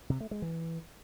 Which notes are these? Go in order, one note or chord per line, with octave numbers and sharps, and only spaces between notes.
C3
A3
G#3
E3